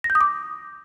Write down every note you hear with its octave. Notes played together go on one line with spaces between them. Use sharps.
A#6
G6
D#6
D6